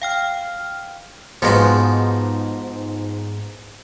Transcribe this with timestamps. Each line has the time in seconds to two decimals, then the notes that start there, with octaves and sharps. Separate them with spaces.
0.02 F5 G5 F6
1.42 G#2 F3 G#3 B3 F#4